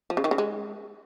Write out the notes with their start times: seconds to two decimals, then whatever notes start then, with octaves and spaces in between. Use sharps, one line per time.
0.10 F3
0.17 C#3
0.24 D#3
0.31 C#3
0.38 G#3